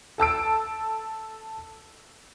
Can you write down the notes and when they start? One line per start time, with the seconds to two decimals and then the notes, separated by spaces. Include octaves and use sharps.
0.18 A4 A5 E6 D7